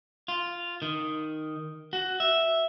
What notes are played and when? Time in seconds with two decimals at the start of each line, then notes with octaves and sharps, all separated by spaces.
0.28 F4
0.82 D#3
1.93 F#4
2.20 E5